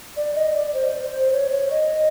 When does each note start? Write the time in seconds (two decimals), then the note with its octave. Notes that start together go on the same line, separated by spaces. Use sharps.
0.17 D5
0.36 D#5
0.55 D5
0.74 C5
1.03 C5
1.33 C#5
1.51 C#5
1.71 D#5